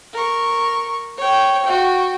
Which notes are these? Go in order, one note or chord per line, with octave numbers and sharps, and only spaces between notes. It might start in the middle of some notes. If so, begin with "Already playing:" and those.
A#4 C#6
C#5 G5
F#4 G5